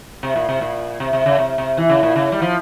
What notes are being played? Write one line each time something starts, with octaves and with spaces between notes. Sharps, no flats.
C3
A#2
C3
A#2
C3
C3
C#3
C3
C3
E3
C#3
A#2
C#3
G3
F3